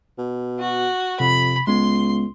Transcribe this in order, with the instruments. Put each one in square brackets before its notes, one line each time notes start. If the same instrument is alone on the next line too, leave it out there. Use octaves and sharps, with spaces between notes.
[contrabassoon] B2
[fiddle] F#4
[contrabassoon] F2 [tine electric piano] C3 [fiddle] B5
[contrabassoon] C#2 [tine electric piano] G#3 B3 [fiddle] C6